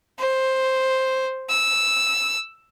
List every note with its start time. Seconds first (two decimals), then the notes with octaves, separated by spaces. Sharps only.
0.19 C5
1.50 E6